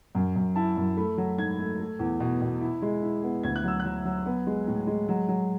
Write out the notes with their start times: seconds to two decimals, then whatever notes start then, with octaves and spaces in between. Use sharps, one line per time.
0.15 F#2
0.36 F#2
0.56 E4 A5
0.77 F#2
0.97 A3 B5
1.18 F#3
1.38 G#2 G#6
1.58 A3
1.80 A3
1.99 E2
2.20 B2
2.41 B2
2.61 E4
2.82 G#3
3.02 E4
3.23 B3
3.43 D2 G#6
3.56 F#6
3.64 F#3 E6
3.80 F#6
3.85 F#3
4.05 F#3
4.26 B3
4.47 G#3
4.67 A2
4.87 G#3
5.09 F#3
5.29 F#3